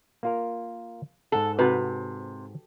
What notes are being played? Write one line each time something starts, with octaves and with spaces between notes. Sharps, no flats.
A#3 F4 A#4
G#2 A4 F#5 A5
C3 F#4 B4